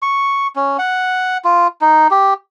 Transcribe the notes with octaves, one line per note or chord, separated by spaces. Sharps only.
C#6
C#4
F#5
F4
D#4
G4